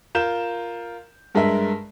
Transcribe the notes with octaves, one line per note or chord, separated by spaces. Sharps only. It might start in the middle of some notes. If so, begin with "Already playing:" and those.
F4 A#4 G6 E7
G2 G#3 A#4 E5